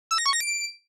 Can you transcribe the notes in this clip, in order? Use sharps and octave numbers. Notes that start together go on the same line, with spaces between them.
E6
A#6
C#6
A#6
D7